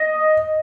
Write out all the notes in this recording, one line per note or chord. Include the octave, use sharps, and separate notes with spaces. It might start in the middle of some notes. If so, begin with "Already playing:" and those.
Already playing: D#5